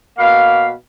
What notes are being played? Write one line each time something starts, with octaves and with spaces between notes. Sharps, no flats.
B2 A#3 B4 F5